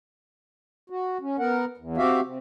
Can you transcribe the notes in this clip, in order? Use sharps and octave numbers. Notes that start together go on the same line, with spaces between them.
F#4
C#4
B3 A#4 F#5
E2
C4 F#4 G4 E5 F5
C3